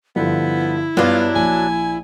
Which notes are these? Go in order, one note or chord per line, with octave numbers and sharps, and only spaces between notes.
G2 D3 F3 B3 E4
G2 F#3 B3 D4 F4
A#1 G#5